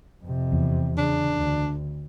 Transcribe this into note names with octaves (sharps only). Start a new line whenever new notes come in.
F2 C3
E2
C#3 D4
D2